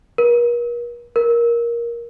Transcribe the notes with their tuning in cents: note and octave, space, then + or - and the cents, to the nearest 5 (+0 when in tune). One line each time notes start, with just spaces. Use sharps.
A#4 +45
A#4 +15